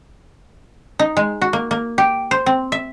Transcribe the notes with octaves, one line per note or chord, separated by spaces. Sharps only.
D#4
G#3
F#4
A#3
A#3
G4
C5
C4
E5